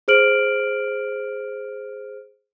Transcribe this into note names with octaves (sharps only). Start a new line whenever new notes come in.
G#4 C5 F6 D7 F#7